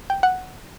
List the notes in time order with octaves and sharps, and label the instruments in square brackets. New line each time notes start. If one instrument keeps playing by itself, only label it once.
[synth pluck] G5
F#5